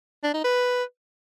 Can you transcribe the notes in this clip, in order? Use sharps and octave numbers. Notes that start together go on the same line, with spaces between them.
D4
D#4
B4